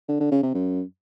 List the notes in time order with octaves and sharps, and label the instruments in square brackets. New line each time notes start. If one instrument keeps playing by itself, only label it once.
[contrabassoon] D3
D3
C#3
C3
F#2